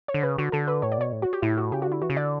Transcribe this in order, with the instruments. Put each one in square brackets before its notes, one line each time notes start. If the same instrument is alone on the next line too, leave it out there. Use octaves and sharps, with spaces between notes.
[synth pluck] C#5
[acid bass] D3
[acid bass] C#3 [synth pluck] B4
[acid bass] D3 [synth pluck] F#4
[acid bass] D3 [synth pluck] A4
[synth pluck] B4
[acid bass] A2 [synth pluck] C#5
[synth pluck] D5
[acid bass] B2 [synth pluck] C#5
[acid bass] A2
[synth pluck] F#4
G4
[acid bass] A2 [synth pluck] E4
[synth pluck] F#4
[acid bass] C#3 [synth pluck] G4
[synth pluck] F#4
[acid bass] D3 [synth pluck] E4
[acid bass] E3 [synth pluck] F#4
[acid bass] C#3
[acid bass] D3 [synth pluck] D5